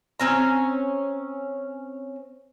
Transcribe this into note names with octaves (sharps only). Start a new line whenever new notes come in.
C4 C#4 A#5